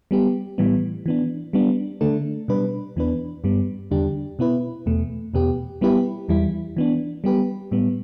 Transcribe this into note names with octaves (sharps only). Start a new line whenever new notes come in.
G3 B3 G4
A2 E3 G3 B3
E3 B3 D4
G3 B3 D4
D3 A3 D4 A4
B2 G3 D4 B4
E2 E3 B3 D4 B4
G2 G3 B3
E2 D3 G3 D4 G4
B2 B3 E4 B4
E2 B2 A3
E2 B2 B3 G4
G3 B3 E4 G4 B4
E2 E3 G3 E4
E3 B3 D4
G3 B3 G4 B4
A2 G3 B3